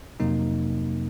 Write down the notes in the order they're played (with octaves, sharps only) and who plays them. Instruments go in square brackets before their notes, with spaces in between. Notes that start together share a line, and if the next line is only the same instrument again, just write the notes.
[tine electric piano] F2 C3 F#3 A#3 D#4